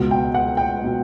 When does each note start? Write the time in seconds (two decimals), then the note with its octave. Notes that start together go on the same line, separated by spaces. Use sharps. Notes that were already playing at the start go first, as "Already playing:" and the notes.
Already playing: C#2 B2 F#5
0.11 G5
0.34 F#5
0.57 G5
0.84 B2